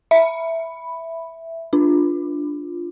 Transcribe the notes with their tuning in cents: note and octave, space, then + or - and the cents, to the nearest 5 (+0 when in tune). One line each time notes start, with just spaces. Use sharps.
E5 +0 B5 +0
D4 +0 F4 +0